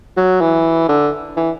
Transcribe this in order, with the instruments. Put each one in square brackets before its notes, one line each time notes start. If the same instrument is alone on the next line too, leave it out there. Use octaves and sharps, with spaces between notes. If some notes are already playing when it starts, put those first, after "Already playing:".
[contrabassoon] F#3
E3
D3
E3